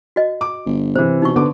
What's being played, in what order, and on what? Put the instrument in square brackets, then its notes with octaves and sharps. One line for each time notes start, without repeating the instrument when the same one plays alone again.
[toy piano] F#4 D#5
[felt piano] D6
[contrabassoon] G1
[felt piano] C3 E3 [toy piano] C5
[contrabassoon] B2 [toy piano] D#4 C#6
[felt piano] D3 B3 D6